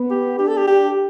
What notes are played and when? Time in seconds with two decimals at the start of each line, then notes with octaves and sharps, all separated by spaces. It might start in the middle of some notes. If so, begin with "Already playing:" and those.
Already playing: B3
0.10 G4
0.39 D4 G4
0.48 A4
0.57 G4
0.68 G4